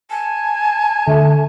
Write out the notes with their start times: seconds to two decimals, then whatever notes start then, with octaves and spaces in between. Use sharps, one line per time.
0.10 G#5 A5
1.07 D3 A3